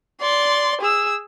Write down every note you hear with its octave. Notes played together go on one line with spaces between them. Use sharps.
D5 C6
G#4 E6